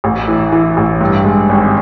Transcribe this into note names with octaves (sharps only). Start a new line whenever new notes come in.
A1
E3
E3
A1
G2
G#3
G#1